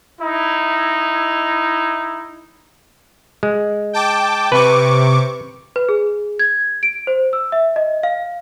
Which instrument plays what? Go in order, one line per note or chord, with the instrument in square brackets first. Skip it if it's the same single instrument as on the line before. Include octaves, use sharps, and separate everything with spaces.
[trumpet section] D#4 E4
[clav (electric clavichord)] G#3
[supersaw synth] G5 A5 D6
[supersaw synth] C3 C#6 D6 [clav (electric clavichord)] B4
[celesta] B4
G#4
G#6
D7
C5
E6
E5
D#5
F5